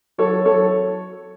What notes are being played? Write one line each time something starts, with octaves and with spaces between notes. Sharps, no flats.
F#3 A4 C#5
F#3 A4 C#5